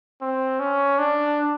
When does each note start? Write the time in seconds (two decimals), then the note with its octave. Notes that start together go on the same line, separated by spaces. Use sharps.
0.21 C4
0.60 C#4
0.99 D4